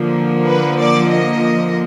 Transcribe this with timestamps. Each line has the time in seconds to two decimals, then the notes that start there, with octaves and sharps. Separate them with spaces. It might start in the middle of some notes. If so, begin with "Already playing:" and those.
Already playing: D3 F3 A#3
0.48 B4
0.80 D5
1.11 D#5